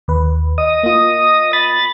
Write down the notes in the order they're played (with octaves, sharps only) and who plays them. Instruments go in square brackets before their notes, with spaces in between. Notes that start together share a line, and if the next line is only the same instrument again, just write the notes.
[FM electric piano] D#2 B4
[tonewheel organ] D#5 D#6
[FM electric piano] A#3 F4
[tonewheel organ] B5 A6